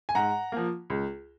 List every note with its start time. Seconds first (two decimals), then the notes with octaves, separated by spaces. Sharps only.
0.09 G#5
0.15 G#2 F#5 A#5
0.52 F3 A#3
0.90 C#2